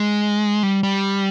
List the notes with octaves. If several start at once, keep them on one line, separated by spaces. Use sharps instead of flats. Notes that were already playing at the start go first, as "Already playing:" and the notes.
Already playing: G#3
G3
G3